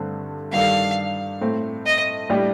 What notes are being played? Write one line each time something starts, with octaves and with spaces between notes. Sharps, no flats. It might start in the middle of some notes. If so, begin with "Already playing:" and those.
Already playing: G2 D3 A3 C4
G2 D#3 G3 D4 A4 F5
A2 A3 C4
D#5
A2 G3 D4 G4